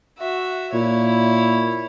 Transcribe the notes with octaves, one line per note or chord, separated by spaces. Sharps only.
F#4 E5
A#2 E4 C#5